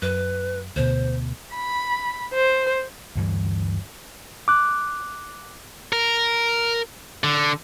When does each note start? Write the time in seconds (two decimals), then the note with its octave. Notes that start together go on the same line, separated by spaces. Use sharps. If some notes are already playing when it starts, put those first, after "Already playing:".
0.02 F#2 B4
0.76 D2 B2 C5
1.55 B5
2.34 C5
3.15 D2 G2 E3
4.48 D6 F#6
5.93 A#4
7.24 D3